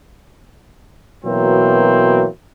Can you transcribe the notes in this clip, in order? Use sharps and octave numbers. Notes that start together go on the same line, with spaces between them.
B2 E3 F#3 A#3 C4